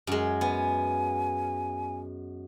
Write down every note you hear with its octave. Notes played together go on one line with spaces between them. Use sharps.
F#2 G#3
B3 G#5